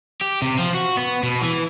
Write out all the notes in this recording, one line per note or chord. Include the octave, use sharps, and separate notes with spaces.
G4
C3
F3
F#4
B3
B2
E3